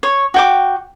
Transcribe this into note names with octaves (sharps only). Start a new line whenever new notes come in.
C#5
F#4 G5 D6